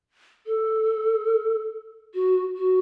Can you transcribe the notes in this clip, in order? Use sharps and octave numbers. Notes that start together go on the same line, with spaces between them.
A4
F#4
F#4